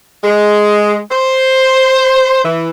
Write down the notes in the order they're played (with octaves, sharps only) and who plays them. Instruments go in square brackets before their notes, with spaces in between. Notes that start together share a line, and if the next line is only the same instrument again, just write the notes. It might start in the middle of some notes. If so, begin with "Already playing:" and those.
[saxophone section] G#3
C5
E3